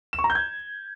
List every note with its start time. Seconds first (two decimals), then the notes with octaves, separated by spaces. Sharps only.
0.13 E7
0.19 C#6
0.24 A#5
0.30 G6
0.35 G#6